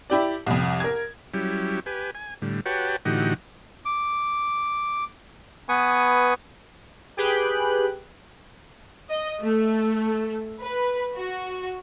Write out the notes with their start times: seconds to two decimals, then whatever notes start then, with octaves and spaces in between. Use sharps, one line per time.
0.10 E4 G4 D5
0.46 C2 F2
0.80 A#4 G#6
1.34 F#3 G3 C#4 E4 G4
1.86 G4 B4 G#5
2.15 G#5
2.42 A2 D3 G3
2.66 F#4 G4 B4 C#5 G5 A5
3.05 A2 D3 E3 D#4 F#4 G4
3.85 D6
5.69 B3 B4 G#5 C#6 D#6
7.17 G4 G#4 B4 G5 F#6
9.10 D#5
9.41 A3
10.62 B4
11.16 F#4